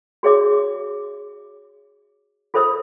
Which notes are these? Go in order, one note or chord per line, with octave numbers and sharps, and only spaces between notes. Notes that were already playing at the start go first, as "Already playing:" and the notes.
F#4 G#4 C#5 E5 D6
F4 A4 C5 E5 D#6 E6